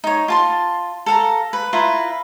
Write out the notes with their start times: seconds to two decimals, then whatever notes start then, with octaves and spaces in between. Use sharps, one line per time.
0.04 D#4 C#5
0.28 F4 A5 C6
1.06 A4 F5 A#5
1.53 B4
1.73 E4 F4 B4 A#5